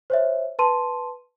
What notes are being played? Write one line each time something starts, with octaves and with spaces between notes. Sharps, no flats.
C5 C#5 E5
B4 A5 C6 D#7